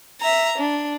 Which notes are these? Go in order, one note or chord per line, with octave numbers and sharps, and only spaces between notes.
E5 A#5
D4